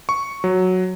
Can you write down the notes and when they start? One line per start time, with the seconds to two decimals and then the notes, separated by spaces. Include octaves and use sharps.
0.09 C#6
0.44 F#3